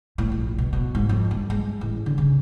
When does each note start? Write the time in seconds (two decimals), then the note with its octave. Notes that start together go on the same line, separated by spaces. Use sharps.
0.18 A2
0.32 A#1
0.58 B2
0.73 B2
0.95 G#2
1.09 F2
1.31 G2
1.50 G#3
1.81 A1
2.06 D3
2.18 C#3